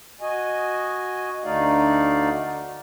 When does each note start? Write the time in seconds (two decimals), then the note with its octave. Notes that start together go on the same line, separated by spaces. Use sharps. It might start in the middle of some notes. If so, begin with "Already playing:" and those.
0.21 F#4 D#5 G#5
1.44 D2 D3 A3 D#4 D5 F5